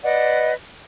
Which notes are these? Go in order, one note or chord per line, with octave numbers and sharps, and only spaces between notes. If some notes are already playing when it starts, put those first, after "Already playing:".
B4 D5 D#5 F#5